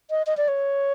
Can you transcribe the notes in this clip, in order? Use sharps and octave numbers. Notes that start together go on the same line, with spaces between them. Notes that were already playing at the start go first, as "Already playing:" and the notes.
D#5
D#5
D5
C#5